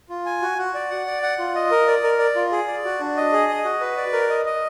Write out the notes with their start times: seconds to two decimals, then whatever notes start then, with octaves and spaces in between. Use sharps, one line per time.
0.09 F4
0.26 G#5
0.42 F#4
0.58 F#4
0.74 D5
0.90 F#5
1.07 D5
1.23 F#5
1.39 F4
1.55 D#5
1.71 A#4
1.87 D5
2.03 A#4
2.19 D5
2.35 F4
2.52 G#4
2.67 D5
2.85 F#4
3.00 D4
3.17 D#5
3.33 G#4
3.49 D#5
3.65 F#4
3.81 B4
3.97 D5
4.13 A#4
4.30 D#5
4.46 D#5